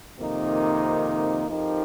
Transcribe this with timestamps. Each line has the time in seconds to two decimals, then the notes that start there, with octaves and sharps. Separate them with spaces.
0.19 F2 C3 D#3 A#3 D#4
1.48 F2 F3 D#4 G4 A#4